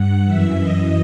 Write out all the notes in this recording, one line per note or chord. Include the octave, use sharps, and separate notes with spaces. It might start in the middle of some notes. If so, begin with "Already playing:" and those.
Already playing: G2 F#5
F#2 E3 E5
D#5